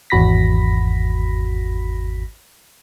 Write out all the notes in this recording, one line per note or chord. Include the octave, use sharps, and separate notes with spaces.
G#1 E2 F#4 B5 A#6 B6